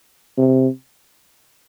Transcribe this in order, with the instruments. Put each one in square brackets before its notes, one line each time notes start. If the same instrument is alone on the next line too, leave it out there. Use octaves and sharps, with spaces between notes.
[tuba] C3